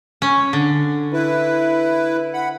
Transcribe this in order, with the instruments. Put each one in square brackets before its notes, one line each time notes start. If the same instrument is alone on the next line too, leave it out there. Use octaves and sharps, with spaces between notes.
[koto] C#4
D3
[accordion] E4 B4
F#5 B5